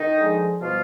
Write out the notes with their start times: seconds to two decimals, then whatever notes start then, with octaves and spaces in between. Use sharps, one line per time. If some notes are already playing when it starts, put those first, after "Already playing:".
Already playing: D#3 D#4
0.15 D3 F3 G#3
0.61 B2 F3 G3 F4